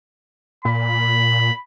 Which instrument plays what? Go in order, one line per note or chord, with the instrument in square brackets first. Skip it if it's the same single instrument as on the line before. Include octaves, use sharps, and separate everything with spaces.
[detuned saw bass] A#2 [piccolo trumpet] B5